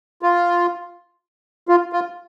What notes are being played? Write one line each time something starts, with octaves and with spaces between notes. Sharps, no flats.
F4
F4
F4